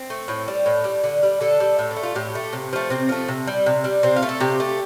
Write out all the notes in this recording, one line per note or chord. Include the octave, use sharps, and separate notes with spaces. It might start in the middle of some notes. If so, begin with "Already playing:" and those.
Already playing: C4
A3
A2
G3
A2
G3
D3
G3
D3 A4
G3
A2
D4
A3
F4
A2 G4
A3
C3
F3 A3
C3 C4
F3 A3
C3
G3
C3
G3
C3 C4
F4
A3
A4
C3 G4
A3